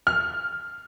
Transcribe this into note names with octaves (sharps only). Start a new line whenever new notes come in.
F6